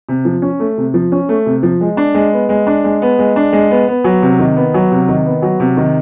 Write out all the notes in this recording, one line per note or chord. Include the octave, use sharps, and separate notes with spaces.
C3
F3
C#4
A3
C3
F3
C#4
A3
C3
F3
G#3
D4
G#3
B3
G#3
D4
G#3
B3
G#3
D4
G#3
B3
B3
F#3
C3
D#3
B3
F#3
C3
D#3
B3
F#3
C3
D#3